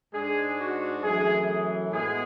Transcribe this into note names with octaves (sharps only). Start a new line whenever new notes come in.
G#2 G#3 D4 G#4
F#4
F#2 E3 A3 G#4
A2 G#3 B3 G#4